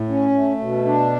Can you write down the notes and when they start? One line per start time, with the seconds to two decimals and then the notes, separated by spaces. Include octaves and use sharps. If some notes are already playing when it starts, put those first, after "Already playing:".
Already playing: A2
0.09 C#4
0.35 A3
0.59 B2
0.85 D4